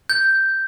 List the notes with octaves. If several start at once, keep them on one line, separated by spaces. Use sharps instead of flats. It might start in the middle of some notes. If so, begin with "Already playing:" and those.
G6